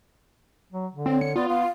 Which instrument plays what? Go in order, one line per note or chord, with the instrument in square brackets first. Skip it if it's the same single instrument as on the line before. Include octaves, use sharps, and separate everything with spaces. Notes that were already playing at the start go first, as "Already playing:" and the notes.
[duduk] F#3
D3
[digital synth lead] C4 [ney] C#5
[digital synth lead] C#7
[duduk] B3 [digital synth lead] F4 [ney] D5
[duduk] B3 [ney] F5